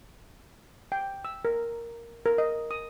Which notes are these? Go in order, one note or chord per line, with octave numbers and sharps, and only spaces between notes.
G5
E6
A#4
A#4
D#5
D#6